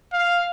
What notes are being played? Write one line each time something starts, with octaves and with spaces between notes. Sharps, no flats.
F5